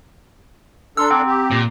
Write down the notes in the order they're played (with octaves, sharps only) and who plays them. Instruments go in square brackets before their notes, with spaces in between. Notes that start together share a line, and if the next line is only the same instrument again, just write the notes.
[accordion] D4 A4 [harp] A#5 C6 F6 [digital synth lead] E6
[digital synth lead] C4 [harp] F#5 D6 G#6
[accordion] G4
[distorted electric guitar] A#2 [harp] A#6 C7